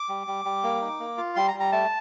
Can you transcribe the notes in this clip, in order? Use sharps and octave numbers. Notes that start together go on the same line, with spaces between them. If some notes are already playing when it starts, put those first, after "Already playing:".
Already playing: D6
G3
G3
G3
A#3
D#4
A#3
F4
G3 C6
A#5
G3
A#5
A3 A5